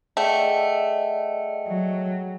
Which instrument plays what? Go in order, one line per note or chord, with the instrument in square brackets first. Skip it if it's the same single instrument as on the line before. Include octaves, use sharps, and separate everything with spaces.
[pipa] A3 [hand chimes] G#4 F#5 G5 [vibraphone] D5 D#5
[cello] F#3